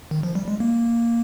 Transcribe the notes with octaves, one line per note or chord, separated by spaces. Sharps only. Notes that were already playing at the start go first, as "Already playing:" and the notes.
D#3
F3
G3
G#3
A#3